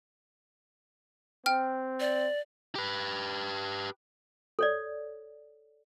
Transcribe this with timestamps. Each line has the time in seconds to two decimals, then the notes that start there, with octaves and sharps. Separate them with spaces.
1.46 C4 G5 F6
2.00 D5
2.75 G4 B4
4.59 A4 C#5 D5